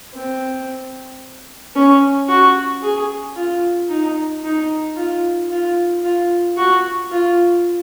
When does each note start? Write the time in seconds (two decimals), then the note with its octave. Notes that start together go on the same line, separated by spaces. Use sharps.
0.14 C4
1.76 C#4
2.29 F#4
2.83 G#4
3.36 F4
3.90 D#4
4.44 D#4
4.97 F4
5.51 F4
6.04 F4
6.58 F#4
7.12 F4